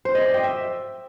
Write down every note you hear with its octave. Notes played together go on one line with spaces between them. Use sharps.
C5
D#5
D5
G5
E5